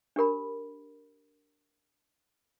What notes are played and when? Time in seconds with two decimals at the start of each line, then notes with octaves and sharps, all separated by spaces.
0.16 D4 G4 A#4 B5